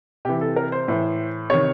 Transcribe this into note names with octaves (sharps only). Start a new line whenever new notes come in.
C3 E3 G4
A4
A#4
C5
A2 E3
C3 D#3 C#5